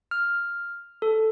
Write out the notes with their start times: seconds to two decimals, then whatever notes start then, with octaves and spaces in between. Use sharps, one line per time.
0.11 F6
1.02 A4